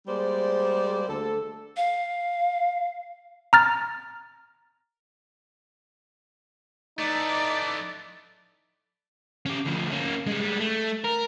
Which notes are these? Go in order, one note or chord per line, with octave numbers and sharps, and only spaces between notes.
G3 G#3 A#3 C5 D5
D2 A4
F5
A#5 F6 A6
E3 A3 D#4 D5
C#4 G4
D2 F3
A#3 C#4
G3 G#3
A3
A#4